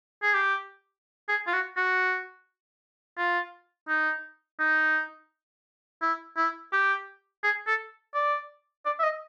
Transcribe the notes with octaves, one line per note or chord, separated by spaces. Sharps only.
G#4
G4
G#4
F4
F#4
F#4
F4
D#4
D#4
E4
E4
G4
G#4
A4
D5
D5
E5
D#5